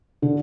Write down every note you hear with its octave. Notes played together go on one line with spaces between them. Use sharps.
D3